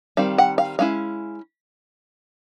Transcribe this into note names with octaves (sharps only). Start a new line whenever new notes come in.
D#3 G3 C4 F5
F#5
F5
G#3 C#4 E4 F5